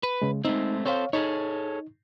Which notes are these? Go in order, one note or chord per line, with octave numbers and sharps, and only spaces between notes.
B4
C#3 G#3
G#3 A3 C4 D#4
C4 A4 C5 C#5 F5
D#4 G#4 A4 C#5